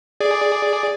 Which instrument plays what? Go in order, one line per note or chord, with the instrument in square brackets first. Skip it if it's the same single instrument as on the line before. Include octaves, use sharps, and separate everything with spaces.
[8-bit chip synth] G#4 D5